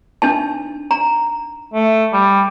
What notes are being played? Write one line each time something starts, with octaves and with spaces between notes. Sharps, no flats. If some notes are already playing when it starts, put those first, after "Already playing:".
D4 D#4 A5
A#5
A3
G3